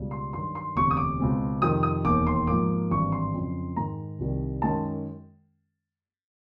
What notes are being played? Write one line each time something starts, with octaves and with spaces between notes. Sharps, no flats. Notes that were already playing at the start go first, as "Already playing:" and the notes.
Already playing: C#2 B2 G3
C6
G2 D#3 F#3 C6
C6
E1 D2 C3 C#6
D#6
D6
C#2 B2 G#3 C4
F2 C3 D#3 D#6
D#6
E1 D#2 D#3 D6
C6
G#2 F3 A#3 D6
G#1 G2 E3 G3 C4 C#6
C6
F2 C#3 F#3
G#2 D#3 G#3 A#5
C2 C3 D#3 G3
F#2 D#3 G#3 C#4 A5